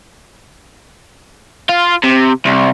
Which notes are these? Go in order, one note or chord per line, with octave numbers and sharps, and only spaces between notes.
F4
C3
C2